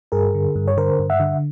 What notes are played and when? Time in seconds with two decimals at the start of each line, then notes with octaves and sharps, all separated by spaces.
0.12 G2 G#4 A#4
0.35 D3
0.56 G2
0.68 C#5
0.77 D3 A#4 C5
0.99 G2
1.10 E5 F#5
1.20 D3